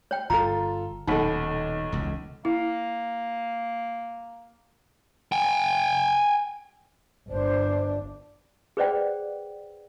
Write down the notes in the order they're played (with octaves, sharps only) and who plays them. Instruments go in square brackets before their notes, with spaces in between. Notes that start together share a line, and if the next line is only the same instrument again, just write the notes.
[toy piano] C#5 G5
[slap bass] G1 [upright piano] F4 A4 [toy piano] A#5
[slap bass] D#1 A2 [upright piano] B1 F#5 B5 [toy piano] D#4 A4
[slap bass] E1 C#2
[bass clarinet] A#3 [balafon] E4
[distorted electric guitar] G5 G#5
[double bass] G1 D4 [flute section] C5
[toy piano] G#4 B4 C5 D5 F#5 G5